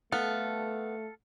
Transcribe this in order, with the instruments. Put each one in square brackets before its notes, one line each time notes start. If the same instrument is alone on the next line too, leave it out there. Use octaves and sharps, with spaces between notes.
[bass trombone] A3 [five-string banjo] B3 [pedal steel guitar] A4 F5